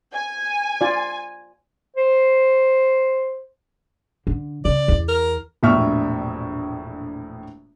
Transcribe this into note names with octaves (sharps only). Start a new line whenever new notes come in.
G#5
F4 D5
C5
D3
C#3 D5
E2
A#4
E1 A#1 A2 E5 C#6 F6